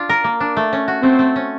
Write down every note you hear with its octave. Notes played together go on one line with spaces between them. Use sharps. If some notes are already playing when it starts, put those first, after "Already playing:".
Already playing: D4 F4
A#4
A#3
D4
A3
C#4
F#4
A3 C4
A3
C#4